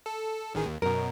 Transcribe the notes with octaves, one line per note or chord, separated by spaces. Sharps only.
A4
A1 D#3 G#4
D#2
F#2 B2 A#4